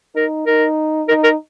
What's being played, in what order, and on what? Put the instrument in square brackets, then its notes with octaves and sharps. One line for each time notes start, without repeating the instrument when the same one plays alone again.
[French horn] D#4 [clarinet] A#4
[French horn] D#4 [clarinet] A#4
[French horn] D#4 [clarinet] A#4
[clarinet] A#4